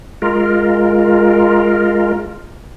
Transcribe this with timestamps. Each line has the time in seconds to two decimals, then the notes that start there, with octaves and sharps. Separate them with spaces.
0.22 G#3 F4 A#4